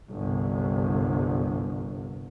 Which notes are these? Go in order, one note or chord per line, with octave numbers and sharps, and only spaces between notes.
G1 C2